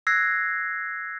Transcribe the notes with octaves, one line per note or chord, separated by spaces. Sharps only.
E6 F#6 G#6 A#6 C7